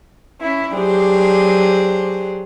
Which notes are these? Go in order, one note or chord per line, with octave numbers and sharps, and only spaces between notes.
C#4 E4
F#3 D4 G4 G#4 C5